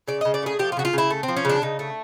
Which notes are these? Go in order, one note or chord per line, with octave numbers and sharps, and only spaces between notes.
C#3 D5
C#3 D#5
D5
A3 G#4
F3 G4
F4
C#3 F#4
F4
C#3 E4
A3
C4
F3
C#4
C#3 D4
C#3 D#4
A3